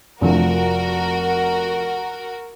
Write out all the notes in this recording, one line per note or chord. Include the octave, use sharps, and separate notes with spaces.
F1 F3 A3 F#4 A#4